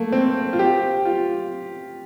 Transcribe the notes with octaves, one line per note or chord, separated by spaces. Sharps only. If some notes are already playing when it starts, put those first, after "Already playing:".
Already playing: A3 A#3
C4
F4
G4
F4